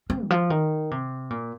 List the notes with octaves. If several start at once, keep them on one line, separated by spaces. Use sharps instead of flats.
C4
D#3
F3
D#3
C3
A#2